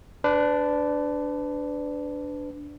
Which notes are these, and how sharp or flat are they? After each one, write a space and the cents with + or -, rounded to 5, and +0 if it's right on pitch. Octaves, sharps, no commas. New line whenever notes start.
D4 -5 B4 +30 D5 +0